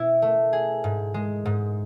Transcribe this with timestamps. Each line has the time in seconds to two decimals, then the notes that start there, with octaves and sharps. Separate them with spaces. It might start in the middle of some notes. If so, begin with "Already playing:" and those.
Already playing: B2 E4
0.22 A3
0.53 G#4
0.84 G#2
1.14 G#3
1.45 G#2